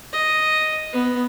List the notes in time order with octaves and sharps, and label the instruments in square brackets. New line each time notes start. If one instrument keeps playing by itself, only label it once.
[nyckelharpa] D#5
B3